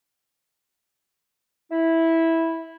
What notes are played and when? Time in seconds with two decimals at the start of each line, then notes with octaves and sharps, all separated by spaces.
1.71 E4